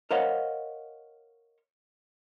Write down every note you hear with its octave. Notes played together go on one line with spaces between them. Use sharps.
A#4 C5 C#5 D#5 F5 F#5